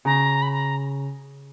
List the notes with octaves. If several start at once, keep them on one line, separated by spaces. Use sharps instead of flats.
C#3 A#5
B5
A#5